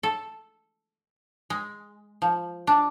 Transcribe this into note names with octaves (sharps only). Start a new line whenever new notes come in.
A4
G#3
F3
D4